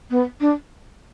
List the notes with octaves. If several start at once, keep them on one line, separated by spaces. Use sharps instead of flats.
B3
D4